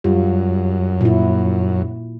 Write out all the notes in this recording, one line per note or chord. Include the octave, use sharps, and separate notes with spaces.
F#2 G3 F4
A#2 E4